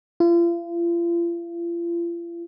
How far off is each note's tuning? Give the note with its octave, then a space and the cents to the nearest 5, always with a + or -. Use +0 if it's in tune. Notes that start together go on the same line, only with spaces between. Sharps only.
F4 -40